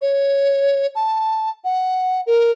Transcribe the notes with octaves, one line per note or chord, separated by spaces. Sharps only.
C#5
A5
F#5
A#4